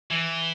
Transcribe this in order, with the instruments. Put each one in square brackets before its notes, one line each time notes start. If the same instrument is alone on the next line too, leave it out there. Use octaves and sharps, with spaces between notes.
[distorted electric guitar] E3